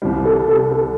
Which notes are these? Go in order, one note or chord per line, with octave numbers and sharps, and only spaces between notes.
C2 C3 E3 G3
A4
A4
A4